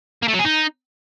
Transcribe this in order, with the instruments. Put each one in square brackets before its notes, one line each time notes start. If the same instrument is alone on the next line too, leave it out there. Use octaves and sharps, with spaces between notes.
[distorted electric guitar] A#3
A3
F#3
G#4
D#4